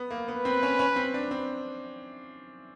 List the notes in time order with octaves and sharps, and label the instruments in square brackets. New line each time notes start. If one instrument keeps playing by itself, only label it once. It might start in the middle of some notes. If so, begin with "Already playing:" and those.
Already playing: [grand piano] B3
A#3
[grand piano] B3 [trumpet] B4
[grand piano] C4
C#4
C#4
C4
D4
C4